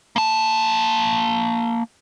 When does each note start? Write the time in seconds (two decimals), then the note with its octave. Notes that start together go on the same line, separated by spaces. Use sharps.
0.16 A#3 A5